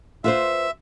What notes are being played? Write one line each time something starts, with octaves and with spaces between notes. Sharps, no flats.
F4 B4 C5 E5